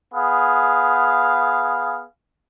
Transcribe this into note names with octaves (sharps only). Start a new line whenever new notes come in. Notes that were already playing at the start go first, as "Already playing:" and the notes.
B3 G#4 F5